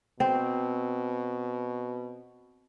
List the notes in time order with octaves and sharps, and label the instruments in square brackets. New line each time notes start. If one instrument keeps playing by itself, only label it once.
[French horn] B2 [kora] C4